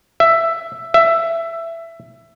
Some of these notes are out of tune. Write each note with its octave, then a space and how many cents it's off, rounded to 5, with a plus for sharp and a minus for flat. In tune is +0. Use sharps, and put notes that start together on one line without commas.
E5 +10
E5 +15